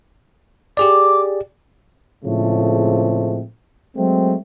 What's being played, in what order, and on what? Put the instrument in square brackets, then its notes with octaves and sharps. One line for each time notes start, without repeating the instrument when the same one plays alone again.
[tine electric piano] G4 G#4 D5 [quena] D6
[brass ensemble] A2 C#3 F3 G#3 A3 C4
F#3 G#3 A3 C4